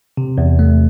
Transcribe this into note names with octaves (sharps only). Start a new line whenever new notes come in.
C3
E2
A3